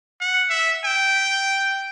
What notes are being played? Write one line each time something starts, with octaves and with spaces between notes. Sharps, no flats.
F#5
E5
G5